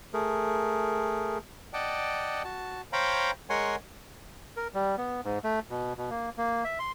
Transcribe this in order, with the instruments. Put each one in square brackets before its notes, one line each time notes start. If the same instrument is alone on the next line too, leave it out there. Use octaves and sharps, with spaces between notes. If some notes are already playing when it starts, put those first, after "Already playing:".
[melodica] A3 G#4 A#4
[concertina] D5 D#5 F#5 G5 A5
F#4 A5
C5 C#5 F5 G5 A#5 B5
G#3 A#4 C#5 F#5 G#5 C6
[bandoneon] A#4
G3
B3
G#2
A3
B2
B2
A#3
A#3
E5
C6